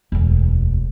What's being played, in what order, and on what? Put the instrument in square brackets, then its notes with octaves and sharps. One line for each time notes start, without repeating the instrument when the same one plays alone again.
[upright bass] E1 D2